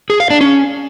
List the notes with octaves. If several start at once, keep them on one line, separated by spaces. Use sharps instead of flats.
G#4
F5
D4
C#4